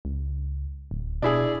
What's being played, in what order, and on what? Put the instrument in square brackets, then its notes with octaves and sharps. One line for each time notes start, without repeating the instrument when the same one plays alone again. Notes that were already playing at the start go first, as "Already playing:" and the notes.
[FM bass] C#2
D1
[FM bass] B2 [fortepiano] D4 E4 G#4